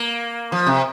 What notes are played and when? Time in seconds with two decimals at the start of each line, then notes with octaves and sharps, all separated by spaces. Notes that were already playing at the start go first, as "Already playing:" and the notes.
Already playing: A#3
0.52 F3
0.67 C3